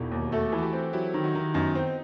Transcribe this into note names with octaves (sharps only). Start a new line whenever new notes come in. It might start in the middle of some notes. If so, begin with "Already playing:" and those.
Already playing: E1 D#4 E4 F#4 G4
D#2
A3 F#4 A4
E3
F#4
E4 G4
C4
F#3 E4 G4
D#3
D#4 F#4
D#3
F#2 B3 D#4
C4